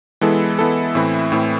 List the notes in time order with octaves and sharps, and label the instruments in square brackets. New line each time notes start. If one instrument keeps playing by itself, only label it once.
[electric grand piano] E3 G#3 B3 E4 A4
E3 G#3 B3 E4 A4
A2 E3 A3 C4 E4
A2 E3 A3 C4 E4